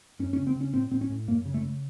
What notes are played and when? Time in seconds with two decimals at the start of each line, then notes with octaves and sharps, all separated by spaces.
0.19 F#2 C#4
0.33 C#4
0.38 C#3
0.47 C4
0.56 C#3 C#4
0.74 A2 C4
0.91 A2 C4
1.01 C#4
1.09 A2
1.28 F#2 A#3
1.45 C#3
1.54 A3
1.63 C#3